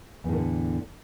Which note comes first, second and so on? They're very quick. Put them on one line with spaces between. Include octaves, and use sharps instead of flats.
E2 A2 D#3 D3